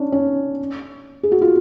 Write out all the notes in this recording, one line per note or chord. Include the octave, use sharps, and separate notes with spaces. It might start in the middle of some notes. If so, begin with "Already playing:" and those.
Already playing: C#4 D4
C#4
G#4
F#4
F4